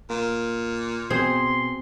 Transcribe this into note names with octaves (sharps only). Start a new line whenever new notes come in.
A#2 A#3
B2 C4 G#4 C5 C6